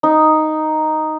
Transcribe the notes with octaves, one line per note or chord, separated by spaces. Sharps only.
D#4